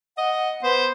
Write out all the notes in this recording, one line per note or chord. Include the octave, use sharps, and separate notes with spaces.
D#5 F#5
B3 C5